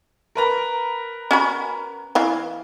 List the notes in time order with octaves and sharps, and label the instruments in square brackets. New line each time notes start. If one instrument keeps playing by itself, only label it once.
[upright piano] A#4 B4 A#5
[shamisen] C#4 F#4 B5
E3 E4 F5